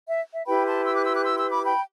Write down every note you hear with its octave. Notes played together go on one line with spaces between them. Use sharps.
E5
E5
E4 G4 B4 G5 B5
A5 C6
C6 E6
D6 F#6
C6 E6
D6 F#6
C6 E6
C6 E6
B5 D6
G5 B5